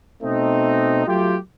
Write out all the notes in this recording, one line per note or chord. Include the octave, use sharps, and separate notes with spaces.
B2 A3 C4 D#4
F#3 A3 F4 G4